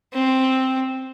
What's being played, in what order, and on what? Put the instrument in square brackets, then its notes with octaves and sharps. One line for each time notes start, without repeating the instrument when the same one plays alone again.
[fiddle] C4